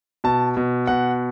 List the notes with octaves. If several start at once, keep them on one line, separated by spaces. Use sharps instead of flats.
B2 A5
B2
B2 F#5